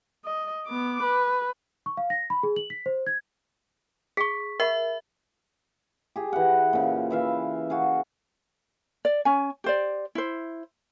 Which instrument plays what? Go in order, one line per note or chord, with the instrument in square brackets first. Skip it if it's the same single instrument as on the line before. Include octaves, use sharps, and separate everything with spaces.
[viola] D#5
B3 D6
B4
[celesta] C#6
F5
A#6
B5
G#4
F#7
B6
C5
G#6
[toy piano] G#4 [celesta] C#6 B6
[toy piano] A#4 F#5 B5 [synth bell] E5
[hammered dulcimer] G4 G#4
E3 F#5
A#2 C#3
E3 E5 F5
F#4 G#4 F5
[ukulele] D5
C#4 G#5
G4 C5 D5
E4 C5